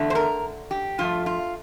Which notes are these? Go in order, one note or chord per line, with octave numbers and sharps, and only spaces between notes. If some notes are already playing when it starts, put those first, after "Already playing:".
Already playing: E2 D3 A3
C5
A#4
G4
G2 F3 A3 F4
F4